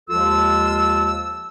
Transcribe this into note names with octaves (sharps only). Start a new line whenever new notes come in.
D#2 F3 G#3 F4 A4 E6